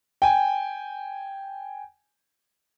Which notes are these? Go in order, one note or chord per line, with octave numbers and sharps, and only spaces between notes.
G5 G#5